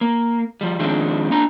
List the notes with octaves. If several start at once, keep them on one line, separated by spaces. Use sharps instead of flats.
A#3
F3 G3
D#3 F3 G#3 C4 D4
A#3 D4 A#5